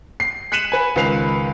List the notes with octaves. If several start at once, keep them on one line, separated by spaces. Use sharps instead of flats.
C7
F#6 B6 C#7 D#7 E7 F#7
B4 G#5
C#2 D#3 B4 C7 F7